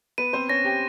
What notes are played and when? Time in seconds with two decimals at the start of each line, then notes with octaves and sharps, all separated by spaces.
0.18 B3 B4 D#7
0.33 C4 C5
0.49 C#4 C#5 A#6
0.64 G4 G5